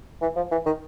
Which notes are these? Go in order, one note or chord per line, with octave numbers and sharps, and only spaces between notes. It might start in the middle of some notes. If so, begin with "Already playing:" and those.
E3
F3
E3
D#3